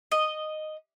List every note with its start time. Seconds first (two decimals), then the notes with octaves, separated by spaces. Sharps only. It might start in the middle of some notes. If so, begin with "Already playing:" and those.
0.12 D#5